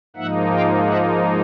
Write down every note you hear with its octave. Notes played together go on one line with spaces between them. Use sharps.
G#2 F3 A#3 D#4 E5 F#5
F5 G5
E5 F#5